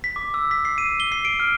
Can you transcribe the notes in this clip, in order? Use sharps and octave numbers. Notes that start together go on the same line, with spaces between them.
B6
D6
E6
B6
C7
D#7
G7
C7
D7
F6